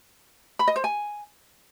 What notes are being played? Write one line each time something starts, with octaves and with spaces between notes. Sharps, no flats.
B5
D#5
C5
G#5